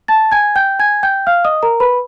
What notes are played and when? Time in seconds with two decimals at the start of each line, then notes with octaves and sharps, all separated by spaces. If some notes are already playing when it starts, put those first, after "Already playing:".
0.08 A5 A6
0.32 G#5 G#6
0.56 G5 G6
0.79 G#5 G#6
1.03 G5 G6
1.27 F5 F6
1.45 D#5 D#6
1.63 A#4 A#5
1.80 B4 B5